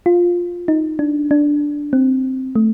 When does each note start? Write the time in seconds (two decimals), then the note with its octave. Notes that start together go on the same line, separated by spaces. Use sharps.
0.06 F4
0.68 D#4
0.99 D4
1.31 D4
1.93 C4
2.56 A3